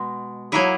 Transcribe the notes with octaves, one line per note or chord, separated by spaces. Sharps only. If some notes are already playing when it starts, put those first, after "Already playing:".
Already playing: B2 G#3
F#3 A#3 E4 G#4